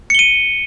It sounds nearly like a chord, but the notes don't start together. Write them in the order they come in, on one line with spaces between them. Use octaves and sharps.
C#7 G7 D#7